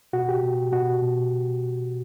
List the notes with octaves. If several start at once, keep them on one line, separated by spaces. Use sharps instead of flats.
B2 F#4
G4
B2
B2 F#4
B2